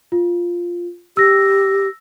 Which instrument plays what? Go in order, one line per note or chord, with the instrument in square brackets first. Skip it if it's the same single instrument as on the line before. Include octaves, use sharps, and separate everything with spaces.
[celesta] F4
[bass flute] G4 [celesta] E6 A#6